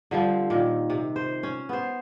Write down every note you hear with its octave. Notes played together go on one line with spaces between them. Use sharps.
D3 F3 G3 C4
A#2 D#3
C3
C5
C#4
B3 C5